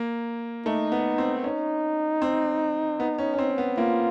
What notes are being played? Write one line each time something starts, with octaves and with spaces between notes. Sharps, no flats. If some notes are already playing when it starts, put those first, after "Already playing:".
Already playing: A#3
A3 D#4
B3
C4
C#4 D#4
C4
B3
C#4
C#4
C4
B3
A#3 F4